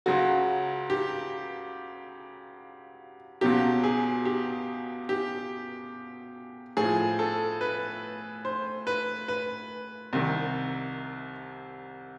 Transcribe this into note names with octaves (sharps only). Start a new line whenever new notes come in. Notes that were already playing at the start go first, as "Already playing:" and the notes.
C#2 C#3 F#3 F#4
G4
C#2 B2 F#3 G4
G#4
G4
G4
A2 F3 G#4
A4
B4
C5
B4
B4
C2 C3 D#3